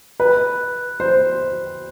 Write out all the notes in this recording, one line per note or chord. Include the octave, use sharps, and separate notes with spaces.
B4
C5